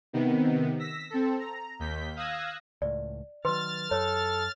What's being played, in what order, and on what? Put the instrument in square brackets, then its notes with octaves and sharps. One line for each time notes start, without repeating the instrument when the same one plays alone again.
[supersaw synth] C3 D#3 B3
E6 A#6 B6
C4 A4
A#5
D#2 G6 B6
F5 D#6 E6 F#6 G#6 A#6
[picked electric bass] C#2 A2 [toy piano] D5
[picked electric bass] D#3 F#3 [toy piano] B4 C6 [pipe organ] F6 A6
[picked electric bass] F#2 [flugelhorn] A4 [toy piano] C#5